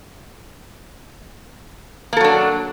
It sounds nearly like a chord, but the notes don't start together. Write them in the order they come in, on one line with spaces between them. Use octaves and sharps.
A#3 A4 F#3 D4